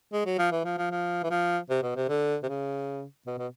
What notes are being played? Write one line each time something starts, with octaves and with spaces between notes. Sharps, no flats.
G#3
F#3
F3
E3
F3
F3
F3
E3
F3
C3
B2
C3
D3
C3
C#3
B2
B2